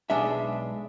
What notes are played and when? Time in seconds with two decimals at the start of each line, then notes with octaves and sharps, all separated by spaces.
0.10 B1 G#3 D4 E5